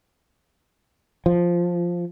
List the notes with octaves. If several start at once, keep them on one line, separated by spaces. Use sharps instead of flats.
F3